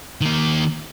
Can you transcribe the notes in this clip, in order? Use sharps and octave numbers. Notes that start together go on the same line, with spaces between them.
D#3 A#3